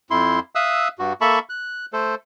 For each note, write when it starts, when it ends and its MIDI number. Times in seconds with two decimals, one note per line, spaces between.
0.11 0.40 41
0.11 0.40 64
0.11 0.40 84
0.55 0.88 76
0.55 0.88 77
0.55 0.88 87
0.55 0.88 88
0.55 0.88 90
0.99 1.13 43
0.99 1.13 66
1.21 1.39 58
1.21 1.39 69
1.21 1.39 76
1.21 1.39 81
1.21 1.39 83
1.21 1.39 85
1.49 1.86 90
1.93 2.15 57
1.93 2.15 69
1.93 2.15 72